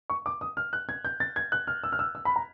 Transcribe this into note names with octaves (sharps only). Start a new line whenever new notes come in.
C#6
D6
D#6
F6
F#6
G#6
G6
A6
G#6
F#6
F6
E6
F6
E6
E6
B5
A#5